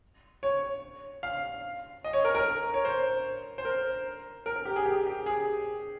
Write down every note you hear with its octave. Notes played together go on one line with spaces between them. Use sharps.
C#5
F5
D#5
C#5
A#4
A#4
C#5
C5
C5
A#4
A#4
A#4
G4
G#4
G4
G4
G#4